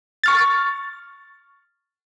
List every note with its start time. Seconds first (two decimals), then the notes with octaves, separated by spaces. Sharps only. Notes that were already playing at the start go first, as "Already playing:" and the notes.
0.24 C#6 F6 A6